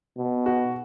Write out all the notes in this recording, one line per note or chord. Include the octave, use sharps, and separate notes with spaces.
B2
F#4